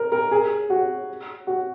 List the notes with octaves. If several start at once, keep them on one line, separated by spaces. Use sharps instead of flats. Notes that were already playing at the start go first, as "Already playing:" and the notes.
Already playing: A#4
A#4
G#4
F#4
F#4